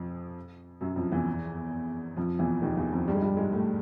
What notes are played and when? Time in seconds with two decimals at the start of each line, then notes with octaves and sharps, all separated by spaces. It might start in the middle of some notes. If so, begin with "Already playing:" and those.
Already playing: F2 F3
0.81 F#2 F#3
0.96 F2 F3
1.12 E2 E3
2.16 F2 F3
2.39 E2 E3
2.62 D#2 D#3
2.77 E2 E3
2.92 F2 F3
3.08 G2 G3
3.15 G#3
3.22 G2 G3
3.37 G#2 G#3
3.52 A2 A3